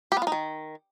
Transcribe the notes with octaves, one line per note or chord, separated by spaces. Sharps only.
G4
B3
F4
D#4
D#3